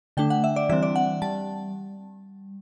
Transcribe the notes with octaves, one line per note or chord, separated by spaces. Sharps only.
D3 A3 D4 G5
F#5
E5
D5
E3 G3 C4 E5
D5
F#5
G3 A5